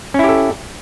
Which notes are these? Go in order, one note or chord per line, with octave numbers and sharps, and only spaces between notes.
C#4 E4 G4 A4